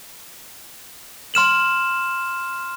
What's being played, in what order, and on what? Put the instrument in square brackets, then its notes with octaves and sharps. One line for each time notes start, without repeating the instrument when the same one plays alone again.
[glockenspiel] C6 F6 E7 F#7